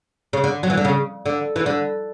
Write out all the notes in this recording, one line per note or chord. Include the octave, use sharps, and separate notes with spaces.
C#3
D3
F#3
E3
D3
C#3
D3
E3
D3